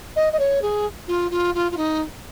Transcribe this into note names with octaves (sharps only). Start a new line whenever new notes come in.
D#5
D#5
C#5
G#4
F4
F4
F4
F4
D#4